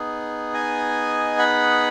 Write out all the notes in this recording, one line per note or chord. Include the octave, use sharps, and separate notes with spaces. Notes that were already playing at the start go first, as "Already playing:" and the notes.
Already playing: B3 D#4 G#4
D#5 G#5
F#5 B5